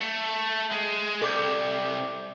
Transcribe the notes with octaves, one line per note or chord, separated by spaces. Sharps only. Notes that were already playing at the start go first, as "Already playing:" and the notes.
A3 C#7
G#3
C2 A4 D6 G6